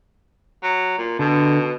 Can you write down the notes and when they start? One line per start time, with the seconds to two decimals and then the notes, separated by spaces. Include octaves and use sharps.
0.63 F#3
0.98 A#2
1.19 B2 D3